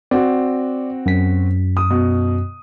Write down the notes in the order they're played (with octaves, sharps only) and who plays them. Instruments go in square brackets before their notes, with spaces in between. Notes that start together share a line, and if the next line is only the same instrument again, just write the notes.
[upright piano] C4 F#4 [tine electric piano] D5
[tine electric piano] F#2 B6
[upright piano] D#6
B2